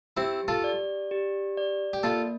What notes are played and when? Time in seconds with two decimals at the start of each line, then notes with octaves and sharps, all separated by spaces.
0.17 C4 E4 G4
0.48 F4 A4
0.64 D5
1.11 G4
1.57 D5
1.93 G4
2.03 A#3 F4 A4